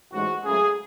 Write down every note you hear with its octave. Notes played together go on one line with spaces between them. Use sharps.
A1 G#2 G#3 F#4
C#2 C#3 F#3 A3 G#4